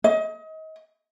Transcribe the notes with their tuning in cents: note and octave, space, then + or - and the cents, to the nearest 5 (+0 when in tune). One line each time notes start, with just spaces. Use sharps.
D#5 +30